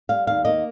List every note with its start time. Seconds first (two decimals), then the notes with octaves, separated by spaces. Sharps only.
0.09 G3 F5
0.27 D#2 F5
0.45 A#3 D#5